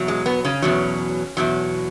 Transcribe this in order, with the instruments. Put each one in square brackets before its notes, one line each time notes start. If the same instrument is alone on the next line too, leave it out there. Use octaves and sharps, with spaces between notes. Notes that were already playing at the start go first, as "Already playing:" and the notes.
Already playing: [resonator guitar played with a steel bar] E2 B2 F#3
G#3
B3
C#3 C#4
E2 B2 F#3
E2 B2 F#3